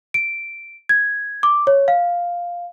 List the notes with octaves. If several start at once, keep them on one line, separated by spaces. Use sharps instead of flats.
D7
G#6
D6
C#5
F5